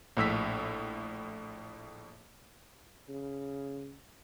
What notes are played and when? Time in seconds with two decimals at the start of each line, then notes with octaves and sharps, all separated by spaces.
0.17 A#1 A2 E6 B6
3.08 C#3